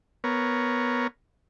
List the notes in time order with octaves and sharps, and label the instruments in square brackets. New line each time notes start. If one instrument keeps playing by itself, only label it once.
[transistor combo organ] B3 A#4 C#5